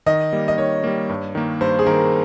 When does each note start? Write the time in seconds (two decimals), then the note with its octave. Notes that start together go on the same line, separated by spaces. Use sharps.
0.06 D#3 D#5
0.33 G3 A#3
0.48 D#5
0.58 D#3 C#5
0.84 G3 A#3
1.09 G2
1.35 D#3 A#3
1.61 G2 C5
1.79 G#4
1.86 D#3 A#3 A#4